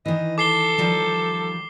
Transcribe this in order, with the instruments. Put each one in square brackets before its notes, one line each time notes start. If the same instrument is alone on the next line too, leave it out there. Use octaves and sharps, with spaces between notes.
[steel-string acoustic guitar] D#3 E3 [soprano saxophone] D#5
[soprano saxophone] A4 [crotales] D6 C7 G7
[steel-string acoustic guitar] D#3 F3 G3